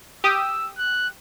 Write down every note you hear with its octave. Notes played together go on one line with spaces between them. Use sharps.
G4 D#6 E6
F#6